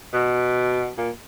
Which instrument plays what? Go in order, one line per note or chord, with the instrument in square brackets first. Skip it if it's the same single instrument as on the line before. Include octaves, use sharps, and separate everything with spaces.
[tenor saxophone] B2
A#2